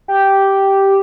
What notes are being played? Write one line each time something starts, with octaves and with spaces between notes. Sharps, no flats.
G4